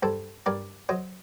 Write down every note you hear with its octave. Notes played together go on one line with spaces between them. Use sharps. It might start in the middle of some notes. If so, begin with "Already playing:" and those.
G2 A4 C5
G2 A#4 D5
F#3 C5 D#5